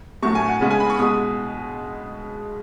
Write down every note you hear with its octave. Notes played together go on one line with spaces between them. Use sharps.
A2 F#3 A3 C#6
G#5
F#5
C#3 G#3 B3
G#5
B5
C#6
B2 G#3 B3 D#6